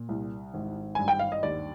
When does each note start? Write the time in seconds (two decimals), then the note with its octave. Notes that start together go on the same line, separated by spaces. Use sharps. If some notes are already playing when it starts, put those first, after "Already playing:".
Already playing: A#2
0.09 C2
0.54 G#1
0.95 G2 G#5
1.08 G5
1.19 F5
1.32 D#5
1.43 D#2 D5